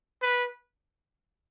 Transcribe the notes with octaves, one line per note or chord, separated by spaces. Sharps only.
B4